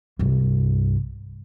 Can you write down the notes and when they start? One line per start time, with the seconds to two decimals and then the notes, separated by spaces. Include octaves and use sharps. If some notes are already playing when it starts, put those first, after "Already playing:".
0.19 C2 G2